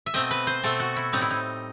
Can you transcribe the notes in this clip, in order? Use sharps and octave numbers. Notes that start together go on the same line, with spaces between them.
E5
B2 A3 C4 D#5
B4
C5
B2 A3 C4 A4
F#4
E4
A2 G3 C4 D#4
E4
D#4